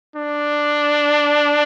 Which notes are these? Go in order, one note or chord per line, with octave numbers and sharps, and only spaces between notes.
D4